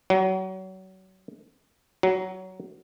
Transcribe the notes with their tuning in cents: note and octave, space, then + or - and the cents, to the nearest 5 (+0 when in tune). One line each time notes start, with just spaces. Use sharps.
F#3 +30
F#3 +15